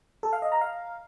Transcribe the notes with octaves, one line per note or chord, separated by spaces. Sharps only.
A4
F5
D#5
A#5
F5